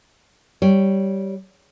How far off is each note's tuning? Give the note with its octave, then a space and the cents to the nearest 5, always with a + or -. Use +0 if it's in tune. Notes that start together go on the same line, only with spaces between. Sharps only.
G3 -10 C#5 +0